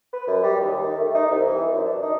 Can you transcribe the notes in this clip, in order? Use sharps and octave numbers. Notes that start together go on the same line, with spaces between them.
B4
F#2
G3
D#2
D#3
A3
D#4
C2
E3
F#2
D4
D#4